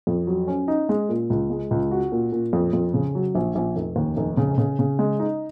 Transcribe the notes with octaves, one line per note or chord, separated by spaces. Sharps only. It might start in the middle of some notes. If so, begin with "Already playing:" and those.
F2
F#3
C#4
D#4
G#3
A#2
C#2
G#3
C#2
F#4
A#2
A#2
F2
F2
C#3
F#3
A#1
A#1
F1
D#2
F1
C#3
C#3
C#3
G#3
D#4